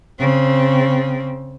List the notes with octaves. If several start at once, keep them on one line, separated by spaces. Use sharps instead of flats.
C#3 C4